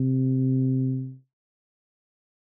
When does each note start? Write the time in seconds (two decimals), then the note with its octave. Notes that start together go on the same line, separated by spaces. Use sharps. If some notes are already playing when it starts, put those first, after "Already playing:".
Already playing: C3